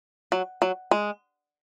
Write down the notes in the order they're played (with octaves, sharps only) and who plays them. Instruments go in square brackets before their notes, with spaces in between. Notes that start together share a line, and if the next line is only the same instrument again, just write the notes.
[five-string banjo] F#3
F#3
G#3